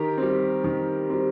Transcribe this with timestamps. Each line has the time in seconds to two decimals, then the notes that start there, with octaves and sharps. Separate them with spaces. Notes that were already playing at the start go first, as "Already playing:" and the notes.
Already playing: D#3 G4 A#4
0.18 C4
0.23 G3
0.64 D#3
1.10 G3 C4